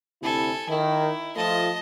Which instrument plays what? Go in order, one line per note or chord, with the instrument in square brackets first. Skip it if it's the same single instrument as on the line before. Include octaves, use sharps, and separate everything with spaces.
[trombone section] D2 C3 E4 [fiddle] A4 G#5
[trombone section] D#3 [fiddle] E4
[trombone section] F3 A3 F4 [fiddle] D#5 A5